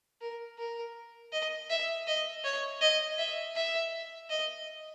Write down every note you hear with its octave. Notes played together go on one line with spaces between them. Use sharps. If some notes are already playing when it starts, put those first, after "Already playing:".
A#4
A#4
D#5
E5
D#5
C#5
D#5
E5
E5
D#5